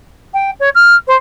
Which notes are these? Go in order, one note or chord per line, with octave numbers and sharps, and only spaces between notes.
G5
C#5
F6
C5